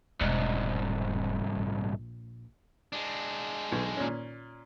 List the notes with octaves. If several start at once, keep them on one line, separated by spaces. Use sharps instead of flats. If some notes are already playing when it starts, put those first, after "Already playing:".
E1 C2 G#2
A#1
G#3 D4
B1
A#2 C#4